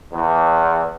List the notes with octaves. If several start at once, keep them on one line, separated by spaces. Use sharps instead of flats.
E2